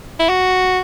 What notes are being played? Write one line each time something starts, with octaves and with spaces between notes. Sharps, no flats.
E4
F#4